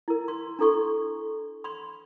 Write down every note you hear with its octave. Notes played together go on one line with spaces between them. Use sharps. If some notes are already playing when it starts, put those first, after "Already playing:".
E4 A#4
C6
D4 E4 A4 C6 C#6
B5 C6